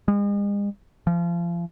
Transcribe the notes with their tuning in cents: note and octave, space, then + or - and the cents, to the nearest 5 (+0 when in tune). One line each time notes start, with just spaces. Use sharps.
G#3 -40
F3 -30